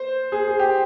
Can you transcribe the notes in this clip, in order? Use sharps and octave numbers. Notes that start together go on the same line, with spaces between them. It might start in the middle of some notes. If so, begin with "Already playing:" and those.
Already playing: C5
G#4
G#4
G4